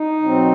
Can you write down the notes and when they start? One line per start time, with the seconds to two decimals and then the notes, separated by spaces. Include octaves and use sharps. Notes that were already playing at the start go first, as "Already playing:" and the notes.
Already playing: D#4
0.22 B2 F#3 C4